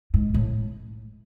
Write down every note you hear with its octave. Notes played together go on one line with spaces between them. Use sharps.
G#2
A2